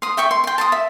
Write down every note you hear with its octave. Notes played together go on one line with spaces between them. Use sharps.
C6 D#6
E5 G5 C#6
C6
G5 C6
A5 C6 D#6
E5